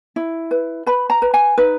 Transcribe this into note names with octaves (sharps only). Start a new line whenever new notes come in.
E4
B4
B4 B5
A#5
B4
G#5
D#4 B4